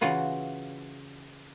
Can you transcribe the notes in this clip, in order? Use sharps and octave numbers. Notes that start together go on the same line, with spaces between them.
C#3 E3 F4 F#4 B4